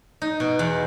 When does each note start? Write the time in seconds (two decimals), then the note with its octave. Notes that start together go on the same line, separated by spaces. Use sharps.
0.22 D#4
0.40 B2
0.59 E2